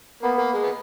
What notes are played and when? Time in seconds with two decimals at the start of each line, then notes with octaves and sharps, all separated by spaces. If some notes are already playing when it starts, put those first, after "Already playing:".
0.23 A#3 B3
0.38 A#3
0.54 G#3
0.63 B3